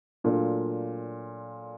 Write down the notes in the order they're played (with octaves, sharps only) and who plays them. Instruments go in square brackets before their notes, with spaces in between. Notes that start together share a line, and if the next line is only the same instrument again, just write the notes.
[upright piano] A#2 F#3 A3 D4 F4